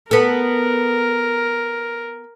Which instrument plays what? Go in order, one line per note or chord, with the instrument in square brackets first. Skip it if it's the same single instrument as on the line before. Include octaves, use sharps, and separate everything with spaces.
[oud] B3 A4 [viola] A#4